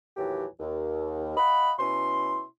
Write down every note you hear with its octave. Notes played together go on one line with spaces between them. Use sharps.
D#2 A2 E3 F#3 G4
D#2
D#5 F5 F#5 B5
B2 C#4 E4 C6